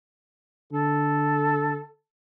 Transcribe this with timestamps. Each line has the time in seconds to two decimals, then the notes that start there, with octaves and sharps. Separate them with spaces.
0.73 D3 A4